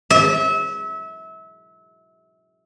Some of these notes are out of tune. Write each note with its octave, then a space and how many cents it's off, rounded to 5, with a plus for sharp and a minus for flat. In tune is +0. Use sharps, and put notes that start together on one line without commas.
E5 -30